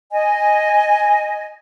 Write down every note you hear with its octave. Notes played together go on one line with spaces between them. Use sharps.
D#5 G#5